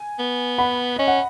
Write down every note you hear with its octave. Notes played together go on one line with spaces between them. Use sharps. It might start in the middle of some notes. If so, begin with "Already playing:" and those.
Already playing: G#5
B3
F#5 B5
C#4 D#5
F#5